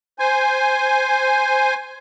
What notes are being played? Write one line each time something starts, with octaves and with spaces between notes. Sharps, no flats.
C5 G#5